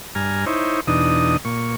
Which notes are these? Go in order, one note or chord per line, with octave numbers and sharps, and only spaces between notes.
G2 G#5 A#5 F6
D#4 E4 C5 C#5
E2 B2 D4 D#4 D#6
A#2 C#6